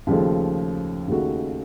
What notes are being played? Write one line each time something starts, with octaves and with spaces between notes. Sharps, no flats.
D#2 C#3 F3 A3
D#2 C#3 A3 D#4 F#4